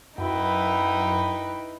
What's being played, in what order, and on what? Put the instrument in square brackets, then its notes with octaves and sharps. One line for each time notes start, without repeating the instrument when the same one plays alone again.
[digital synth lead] F#2 [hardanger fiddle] D#4 B4 [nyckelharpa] E4 G5